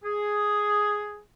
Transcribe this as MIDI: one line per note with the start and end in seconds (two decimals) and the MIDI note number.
0.04 1.20 68